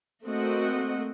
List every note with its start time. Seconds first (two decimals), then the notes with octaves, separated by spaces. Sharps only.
0.25 A3 A#3 C4 F#4 D#5 F#5